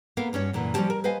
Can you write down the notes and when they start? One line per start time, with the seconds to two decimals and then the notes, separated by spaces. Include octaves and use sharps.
0.17 A#3 B3 A4 A#4 F5
0.33 G2 C#4 F#4 C#5
0.53 F#2 A#2 D3 E3
0.74 F3 G3 C#4 F#4 G4 A5
0.90 A#4
1.04 B4 C5 D#5 F5 G#5